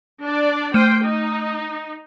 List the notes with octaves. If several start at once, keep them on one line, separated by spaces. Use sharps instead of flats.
D4 D5
A3 C5 G5 F6 D#7
D#4